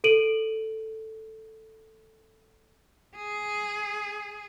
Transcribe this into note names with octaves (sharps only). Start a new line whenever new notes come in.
A4 D7 D#7 F#7
G#4